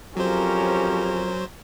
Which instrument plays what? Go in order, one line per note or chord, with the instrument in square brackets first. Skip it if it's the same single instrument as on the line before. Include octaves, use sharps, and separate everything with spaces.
[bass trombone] F2 [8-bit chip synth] F#3 C5 [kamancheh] C#4 A#4 [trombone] G4